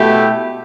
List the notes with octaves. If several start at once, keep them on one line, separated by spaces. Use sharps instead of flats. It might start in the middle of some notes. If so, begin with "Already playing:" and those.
Already playing: B2 A3 E4 G4